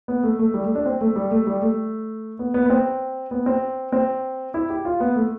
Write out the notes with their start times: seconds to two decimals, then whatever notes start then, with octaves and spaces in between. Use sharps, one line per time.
0.08 B3
0.23 A3
0.39 A3
0.54 G3
0.65 A3
0.75 D4
0.86 C4
1.01 A3
1.16 G3
1.31 A3
1.47 G3
1.62 A3
2.39 B3
2.54 B3
2.66 B3
2.70 C4
3.31 B3
3.46 C4
3.92 C4
4.54 E4
4.70 G4
4.85 F4
5.00 B3
5.16 A3